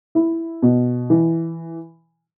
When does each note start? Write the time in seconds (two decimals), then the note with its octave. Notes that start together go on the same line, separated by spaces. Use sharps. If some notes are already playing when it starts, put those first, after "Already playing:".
0.15 E4
0.62 B2
1.10 E3